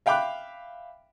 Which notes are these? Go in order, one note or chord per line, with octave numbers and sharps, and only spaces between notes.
E5 F5 G5 B5 D6 F#6